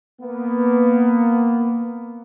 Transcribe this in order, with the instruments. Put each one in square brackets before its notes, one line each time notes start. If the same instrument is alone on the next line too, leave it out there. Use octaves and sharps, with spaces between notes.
[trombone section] A#3 B3